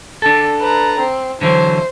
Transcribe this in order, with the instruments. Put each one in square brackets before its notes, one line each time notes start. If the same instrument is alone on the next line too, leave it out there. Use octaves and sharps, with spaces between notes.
[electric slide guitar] D4 A4
[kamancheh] B4 A#5
C4
[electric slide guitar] D3 E3 F#3 [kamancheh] C5